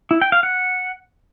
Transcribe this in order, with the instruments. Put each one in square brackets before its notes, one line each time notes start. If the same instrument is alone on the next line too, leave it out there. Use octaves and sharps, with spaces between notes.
[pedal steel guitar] E4
G5
F5
F#5